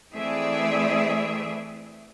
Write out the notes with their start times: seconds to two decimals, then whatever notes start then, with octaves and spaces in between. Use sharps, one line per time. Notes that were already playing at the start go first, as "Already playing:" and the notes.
0.12 E3 A3 C4 G#4 D5 E5